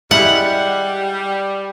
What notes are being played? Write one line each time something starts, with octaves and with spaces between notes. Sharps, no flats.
G3 G#3 E4 F5 F#5